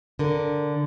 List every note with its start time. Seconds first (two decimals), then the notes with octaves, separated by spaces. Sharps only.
0.19 D3 A#4